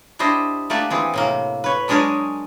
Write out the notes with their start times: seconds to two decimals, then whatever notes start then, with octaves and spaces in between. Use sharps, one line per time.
0.19 D4 E4 G4 C5 D#5
0.70 A3 A#3 G4 D5 F#5 G#5
0.90 E3 C4 G#4
1.14 A2 C3 A#3
1.64 B4 C#5
1.88 F#3 G#3 D4 G#4 A#4 C#5